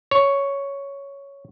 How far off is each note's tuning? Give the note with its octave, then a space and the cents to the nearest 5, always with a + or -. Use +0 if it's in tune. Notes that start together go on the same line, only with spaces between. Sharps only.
C#5 +5